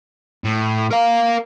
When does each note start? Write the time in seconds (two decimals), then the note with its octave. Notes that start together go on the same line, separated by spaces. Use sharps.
0.44 A2
0.91 A#4 F5